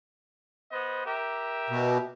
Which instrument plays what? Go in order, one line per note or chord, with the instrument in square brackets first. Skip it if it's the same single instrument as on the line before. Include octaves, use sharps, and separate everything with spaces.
[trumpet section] B3 C5 D#5
G4 A#4 E5
[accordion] B2